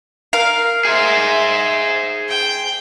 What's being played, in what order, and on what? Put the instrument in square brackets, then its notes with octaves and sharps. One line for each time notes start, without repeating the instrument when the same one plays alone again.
[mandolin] A#4 F5
[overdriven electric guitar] G#4 C5 [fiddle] E5
[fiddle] G5